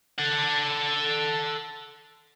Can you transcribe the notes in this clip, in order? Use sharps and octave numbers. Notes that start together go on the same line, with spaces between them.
A4 F#5